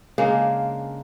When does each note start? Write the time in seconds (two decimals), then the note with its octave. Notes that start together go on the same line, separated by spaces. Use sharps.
0.18 C#3 G#3 A#3 D4